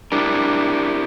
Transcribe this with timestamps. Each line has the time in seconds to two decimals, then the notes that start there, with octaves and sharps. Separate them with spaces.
0.12 D4 E4 G4 A#4